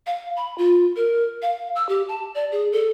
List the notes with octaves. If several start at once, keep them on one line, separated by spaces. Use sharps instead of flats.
F5
B5
F4
A#4
F5
E6
G4
A5
D5
G#4
A4